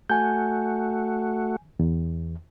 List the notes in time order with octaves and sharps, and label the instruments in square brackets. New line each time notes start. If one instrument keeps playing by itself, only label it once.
[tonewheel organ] A3 F#4 [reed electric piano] G#5 G6
[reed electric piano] E2